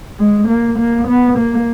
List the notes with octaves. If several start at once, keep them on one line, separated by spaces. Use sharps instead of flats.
G#3
A#3
A#3
B3
A#3